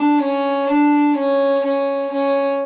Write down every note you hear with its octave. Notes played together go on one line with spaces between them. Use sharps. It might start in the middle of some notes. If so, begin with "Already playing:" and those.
Already playing: D4
C#4
D4
C#4
C#4
C#4